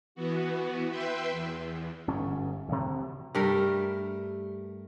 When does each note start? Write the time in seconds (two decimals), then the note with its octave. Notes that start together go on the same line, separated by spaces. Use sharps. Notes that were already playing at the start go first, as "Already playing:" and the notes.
0.15 E3 B3 F#4
0.89 B4 E5 G5 C6
1.31 E2
2.07 G1 G#2 C#4
2.68 D2 C3
3.35 G2 G3 A3 A#4